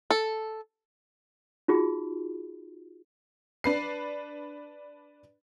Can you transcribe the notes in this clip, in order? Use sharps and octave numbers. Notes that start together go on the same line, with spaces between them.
A4
D#4 F4 F#4 G#4
D4 B4 C7